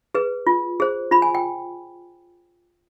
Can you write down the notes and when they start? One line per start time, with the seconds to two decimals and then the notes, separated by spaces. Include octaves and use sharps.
0.15 G#4 B4
0.47 F4
0.80 G#4 C5
1.11 F4 B5
1.22 G#5
1.35 G5